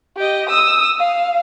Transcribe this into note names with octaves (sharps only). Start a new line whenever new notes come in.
G4 D#5
D#6 E6
F5